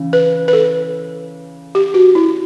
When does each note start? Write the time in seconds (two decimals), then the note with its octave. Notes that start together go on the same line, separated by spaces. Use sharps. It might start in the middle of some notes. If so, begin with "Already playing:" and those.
Already playing: C#3 E3
0.13 B4
0.48 B4
0.53 A4
1.75 G4
1.94 F#4
2.15 E4